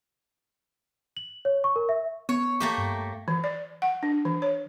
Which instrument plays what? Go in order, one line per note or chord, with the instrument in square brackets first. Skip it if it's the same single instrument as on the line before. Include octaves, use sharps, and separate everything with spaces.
[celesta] F#7
C#5
C#6
A#4
E5
[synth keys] B3 [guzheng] C#5
[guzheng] A3 A#3 G4
[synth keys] G2
[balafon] E3
D5
F#5
D4
E3
C#5